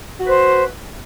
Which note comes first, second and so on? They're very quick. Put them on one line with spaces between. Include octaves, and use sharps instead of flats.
F#4 B4 C5